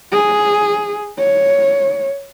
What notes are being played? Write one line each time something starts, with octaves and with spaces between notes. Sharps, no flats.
G#4
C#5